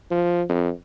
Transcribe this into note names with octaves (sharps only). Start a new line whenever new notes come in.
F3
F2